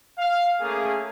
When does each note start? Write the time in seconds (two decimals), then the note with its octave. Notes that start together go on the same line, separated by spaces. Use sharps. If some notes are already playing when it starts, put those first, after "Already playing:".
0.18 F5
0.60 A3 A#3 C#4 G#4